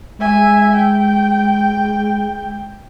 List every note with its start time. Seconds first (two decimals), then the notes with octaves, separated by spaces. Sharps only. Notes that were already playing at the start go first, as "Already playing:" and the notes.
0.20 G#3 E5 G#5
0.76 G5